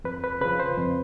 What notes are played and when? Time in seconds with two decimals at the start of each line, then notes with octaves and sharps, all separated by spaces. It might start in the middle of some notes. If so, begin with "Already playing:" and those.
0.04 F2 B4
0.24 B4
0.41 C#3 B4
0.45 F3
0.60 C5
0.78 F2